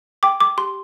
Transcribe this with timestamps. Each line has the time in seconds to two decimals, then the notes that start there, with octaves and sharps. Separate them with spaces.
0.23 G5 D6
0.40 D6
0.58 G4 C6